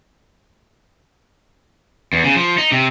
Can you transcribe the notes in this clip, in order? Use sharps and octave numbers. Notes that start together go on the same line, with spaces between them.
E2
C#3
F3
D#4
C3